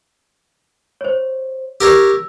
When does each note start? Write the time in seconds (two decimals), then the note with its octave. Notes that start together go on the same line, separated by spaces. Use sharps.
1.01 C5 C#5
1.81 G4 A#4 C#5 E6